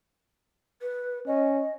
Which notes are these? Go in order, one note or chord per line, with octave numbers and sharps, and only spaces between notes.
B4
C#4 D#5